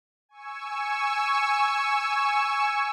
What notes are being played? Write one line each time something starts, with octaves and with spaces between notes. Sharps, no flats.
G#5 C#6 E6